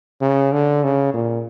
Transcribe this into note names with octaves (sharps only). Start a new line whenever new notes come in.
C#3
D3
C#3
A#2